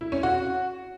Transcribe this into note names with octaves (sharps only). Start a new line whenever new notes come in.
E4
C#4
F#4